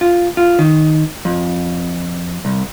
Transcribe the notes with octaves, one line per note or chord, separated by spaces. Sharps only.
F4
F4
D#3
F2
C2